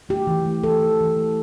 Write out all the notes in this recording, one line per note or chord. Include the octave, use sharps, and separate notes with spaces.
A3 G4
E3
A3
E3 A4
E3
E3
A3